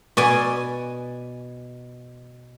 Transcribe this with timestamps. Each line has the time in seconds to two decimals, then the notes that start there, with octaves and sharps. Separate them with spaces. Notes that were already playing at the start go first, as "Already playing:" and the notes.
0.17 B2 D5 G#5